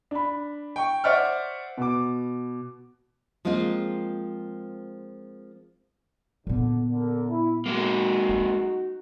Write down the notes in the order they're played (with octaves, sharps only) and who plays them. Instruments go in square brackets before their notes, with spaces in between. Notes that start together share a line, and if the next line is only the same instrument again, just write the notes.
[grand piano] D4 B5
G5 C#6
C5 D5 E5 F#5 C#6 F6
B2 D6
[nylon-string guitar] F3 G#3 A#3 C4 F4
[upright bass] A#2 B3 [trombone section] D3
[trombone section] D3 A#4
E4
[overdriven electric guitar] G#3 A#3 [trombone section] D#4 F#4
[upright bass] C#4